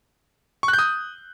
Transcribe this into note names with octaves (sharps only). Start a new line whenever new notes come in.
C#6
F#6
G6
D#6